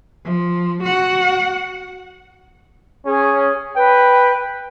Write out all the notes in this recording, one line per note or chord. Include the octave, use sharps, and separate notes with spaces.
F3
F#4 F#5
C#4 G#4
B4 G5